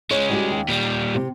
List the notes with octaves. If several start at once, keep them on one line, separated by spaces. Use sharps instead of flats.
G#3 C#4 C#5
G3 F#4 G4
D#2
A#2 G3
C3 G4